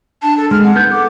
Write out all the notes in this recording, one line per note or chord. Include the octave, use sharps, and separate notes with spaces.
D4 A5
A4
G#3 F6
C4 F#5
B3 D#4 G6
A4 F#5 D6